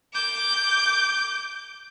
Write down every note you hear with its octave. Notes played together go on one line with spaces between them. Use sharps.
D6 G6